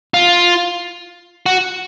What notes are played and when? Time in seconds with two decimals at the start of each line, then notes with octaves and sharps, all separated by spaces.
0.14 F4
1.46 F#4